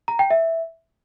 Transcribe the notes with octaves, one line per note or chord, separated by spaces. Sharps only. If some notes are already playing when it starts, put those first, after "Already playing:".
A#5
G5
E5